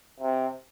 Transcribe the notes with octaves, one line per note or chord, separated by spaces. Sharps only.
C3